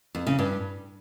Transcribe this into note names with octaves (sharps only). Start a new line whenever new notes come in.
F2
C#3
G2